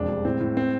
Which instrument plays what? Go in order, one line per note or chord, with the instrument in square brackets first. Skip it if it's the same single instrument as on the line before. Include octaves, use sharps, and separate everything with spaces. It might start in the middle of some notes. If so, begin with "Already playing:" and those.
Already playing: [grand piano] E1 F2 D4
G3
A2 C4
A2
C4